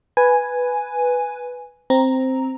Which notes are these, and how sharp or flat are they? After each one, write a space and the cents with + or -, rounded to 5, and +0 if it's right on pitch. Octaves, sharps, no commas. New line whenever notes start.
B4 +0 G#5 +0
C4 +0 A#5 +0